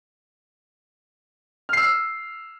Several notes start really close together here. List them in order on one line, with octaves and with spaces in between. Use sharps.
F6 C7 E6